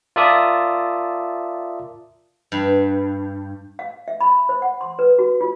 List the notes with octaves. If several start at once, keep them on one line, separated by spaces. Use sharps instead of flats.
F4 A#4 D5 E5 A5 D#6
G2
F5
E5
B5
C5
F#5
C6
B4
F#4
F4